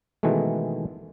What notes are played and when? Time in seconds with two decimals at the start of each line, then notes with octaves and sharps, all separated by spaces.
0.23 B2 D#3 E3 G#3 A3